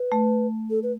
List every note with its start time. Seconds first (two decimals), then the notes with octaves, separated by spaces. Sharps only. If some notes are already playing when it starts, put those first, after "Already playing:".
Already playing: B4
0.12 A3
0.70 A4
0.83 B4